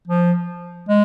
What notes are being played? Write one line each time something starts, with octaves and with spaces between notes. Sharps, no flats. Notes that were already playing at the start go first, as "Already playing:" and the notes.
F3
G#3